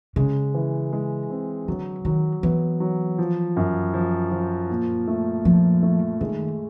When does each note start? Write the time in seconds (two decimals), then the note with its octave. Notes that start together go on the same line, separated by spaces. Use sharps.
0.16 C#3 G#3
0.54 E3
0.93 G#3
1.30 C4
1.68 D3 F#3
2.05 D#3 F#3
2.43 E3 B3
2.80 F#3
3.18 F3
3.56 F#2
3.94 F3
4.31 F3
4.70 A#2
5.07 A3
5.45 A#2 F3
5.83 A3
6.20 D#3 G#3